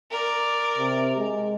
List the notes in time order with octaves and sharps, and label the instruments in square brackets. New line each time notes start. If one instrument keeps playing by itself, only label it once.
[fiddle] A#4 D5
[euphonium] C3
G#3